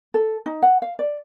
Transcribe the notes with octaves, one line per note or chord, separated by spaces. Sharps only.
A4
D#4
F#5
F5
D5